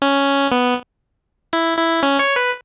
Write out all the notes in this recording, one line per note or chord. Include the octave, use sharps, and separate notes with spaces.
C#4
B3
E4
E4
C#4
C#5
B4